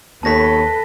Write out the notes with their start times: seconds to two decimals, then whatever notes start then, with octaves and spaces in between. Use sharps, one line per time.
0.23 D#2 B3 A4 B4 C#5 A5 A#6 B6